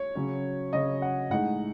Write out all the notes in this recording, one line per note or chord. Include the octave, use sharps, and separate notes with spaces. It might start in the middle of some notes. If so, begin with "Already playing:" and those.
Already playing: C#5
C#3 F#3 C#4
C#3 F#3 C#4 D#5
F#5
A2 G#3 D#4 F#5